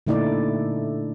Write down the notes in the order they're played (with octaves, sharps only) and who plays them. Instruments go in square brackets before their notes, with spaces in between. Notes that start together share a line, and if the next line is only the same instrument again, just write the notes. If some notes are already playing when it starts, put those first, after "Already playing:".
[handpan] A#2 D3 A3 D#4 E4 D5